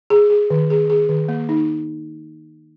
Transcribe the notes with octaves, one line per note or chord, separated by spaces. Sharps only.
G#4
G#4
D#3
G#4
G#4
D#3
A#3
D#4